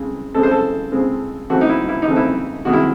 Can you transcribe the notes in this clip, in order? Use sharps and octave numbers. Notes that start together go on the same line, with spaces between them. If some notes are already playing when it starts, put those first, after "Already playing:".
Already playing: C#3 G#3 C4
C#3 G#3 C4 A4
C5
A4
C#3 G#3 C4
C#3 E3 A3 C4 F#4
D#4
E4
E4
D#4
C#3 E3 A3 C4
E4
C3 D#3 G#3 F#4
E4